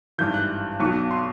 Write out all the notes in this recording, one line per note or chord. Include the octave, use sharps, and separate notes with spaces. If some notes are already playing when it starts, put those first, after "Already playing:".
G#1 G2 E3 G6
F#6
B1 B2 C#6
C6